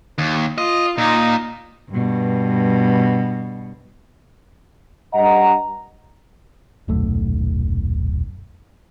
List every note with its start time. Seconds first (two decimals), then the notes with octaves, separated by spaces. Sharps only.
0.18 D#2
0.58 F4 D#5
0.98 A#2 D#4
1.90 G2 B2
5.14 G2 D#5 F#5 A#5
6.88 D#1 B1 F#2 A3